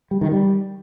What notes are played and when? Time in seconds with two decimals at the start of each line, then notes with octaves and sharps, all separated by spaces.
0.11 G3
0.21 D#3
0.31 G3